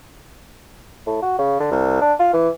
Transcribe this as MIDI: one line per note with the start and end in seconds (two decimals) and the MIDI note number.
1.07 1.18 45
1.22 1.35 66
1.39 1.59 49
1.60 1.68 50
1.71 1.99 36
2.01 2.13 62
2.19 2.28 65
2.33 2.49 52